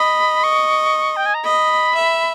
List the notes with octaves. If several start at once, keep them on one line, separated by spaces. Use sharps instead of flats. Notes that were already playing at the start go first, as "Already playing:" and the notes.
Already playing: D#5 B5
C#6
G5
G#5
A#5
D#5 B5
E5